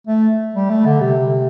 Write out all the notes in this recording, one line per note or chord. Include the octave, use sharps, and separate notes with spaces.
A3
G3
A3
D3
C3